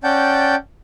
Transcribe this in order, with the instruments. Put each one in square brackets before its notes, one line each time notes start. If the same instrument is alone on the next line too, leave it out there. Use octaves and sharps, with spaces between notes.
[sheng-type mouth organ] C#4 D5 F#5 G5 A5 G6